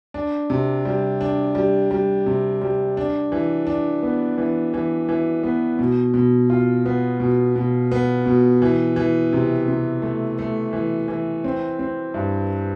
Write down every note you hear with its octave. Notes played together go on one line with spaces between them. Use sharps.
D4
C3
G3
D4
G3
G3
C3
G3
D4
E3
D4
B3
E3
E3
E3
B3
B2
B2
F4
B3
B2
B2
B3
B2
E3
E3
C3
C3
A3
A3
E3
E3
C4
C4
G2